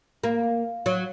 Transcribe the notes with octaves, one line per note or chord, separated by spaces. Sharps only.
A#3
F#3